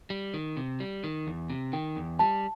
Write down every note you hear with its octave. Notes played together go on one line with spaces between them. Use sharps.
G3
D#3
C3
G3
D#3
E2
C3
D#3 G5
E2
G3 A5